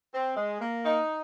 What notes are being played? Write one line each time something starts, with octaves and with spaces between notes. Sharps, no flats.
C4
G#3
A#3
D#4